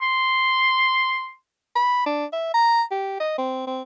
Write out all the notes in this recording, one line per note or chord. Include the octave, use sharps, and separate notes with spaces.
C6
B5
D4
E5
A#5
G4
D#5
C4
C4